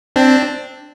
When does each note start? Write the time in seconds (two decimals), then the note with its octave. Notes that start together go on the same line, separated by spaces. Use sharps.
0.16 C4 D4